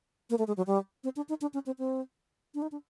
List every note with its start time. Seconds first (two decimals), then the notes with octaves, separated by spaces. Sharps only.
0.30 A#3
0.38 A3
0.47 G#3
0.57 F#3
0.67 G3
1.04 C4
1.16 D4
1.29 D#4
1.41 D4
1.54 C#4
1.66 C4
1.79 C4
2.55 D4
2.62 D#4
2.72 D4